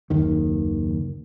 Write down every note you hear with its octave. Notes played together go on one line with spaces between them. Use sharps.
F#1 D#2 D#3